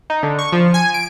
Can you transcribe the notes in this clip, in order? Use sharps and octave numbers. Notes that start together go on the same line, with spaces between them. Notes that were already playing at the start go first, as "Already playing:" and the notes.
D#4
D3
C#6
F3
G#5
D7